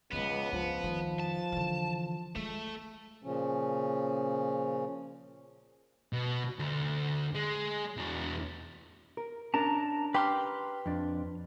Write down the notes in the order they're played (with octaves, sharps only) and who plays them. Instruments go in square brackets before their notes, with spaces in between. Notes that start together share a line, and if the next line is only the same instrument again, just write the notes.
[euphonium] C#2 [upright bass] F3 G#3 [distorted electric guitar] B3
[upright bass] C#2 G2 [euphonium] F3
[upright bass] F2 D#3
[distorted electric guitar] A5
[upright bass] D3 E3
[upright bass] G#3 [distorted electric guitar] A3
[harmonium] A#2 C#3 F3 C#4
[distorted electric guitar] B2
D2
G#3
E2 F#4
[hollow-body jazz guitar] A#4
[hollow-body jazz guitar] C#4 D4 A#4 [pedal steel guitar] A5 A#5
[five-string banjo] G4 [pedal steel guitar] B4 C6 F6
[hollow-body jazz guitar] F2 D4